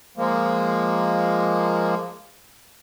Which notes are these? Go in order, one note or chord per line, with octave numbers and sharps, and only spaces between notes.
F3 G#3 A#3